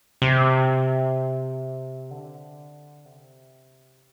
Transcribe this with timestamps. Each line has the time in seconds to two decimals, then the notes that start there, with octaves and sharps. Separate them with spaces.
0.22 C3
2.11 D3
3.05 C3